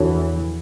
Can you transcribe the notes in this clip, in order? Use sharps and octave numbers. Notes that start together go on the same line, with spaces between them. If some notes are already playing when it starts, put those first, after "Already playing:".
Already playing: E2 E3 D4 F#4 A4 C#5